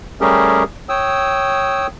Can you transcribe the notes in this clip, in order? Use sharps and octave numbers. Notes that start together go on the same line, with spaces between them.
G3 A3 C#4 G4 G#4 A#4
C#5 G5 D#6 E6